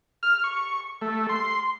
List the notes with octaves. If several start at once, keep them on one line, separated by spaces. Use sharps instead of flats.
F6
C#6
A3
C6